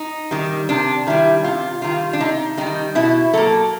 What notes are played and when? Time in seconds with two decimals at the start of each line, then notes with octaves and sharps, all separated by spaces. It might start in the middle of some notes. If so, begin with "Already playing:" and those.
Already playing: D#4
0.31 D#3 G3
0.69 C3 D4
1.07 D#3 G3 E4
1.44 C3 F4
1.82 D#3 G3 F4
2.13 D4
2.20 C3 D#4
2.57 D#3 G3 D#4
2.95 B2 E4
3.33 F#3 A#3 A4